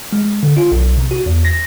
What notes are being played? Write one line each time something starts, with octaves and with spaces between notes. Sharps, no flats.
G#3
D3
F4
B1
C3
F#4
E2
A#6